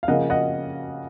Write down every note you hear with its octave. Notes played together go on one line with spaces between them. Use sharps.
F5
C#3 F3 A#3 D#5 F#5
D#5 F#5